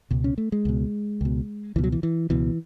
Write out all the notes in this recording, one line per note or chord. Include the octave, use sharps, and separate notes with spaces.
C#2 B2
C#4
A3
G#3
C#2 B2
C#2 B2
C#2 B2 E3
F#3
E3
E3
C#2 B2 E3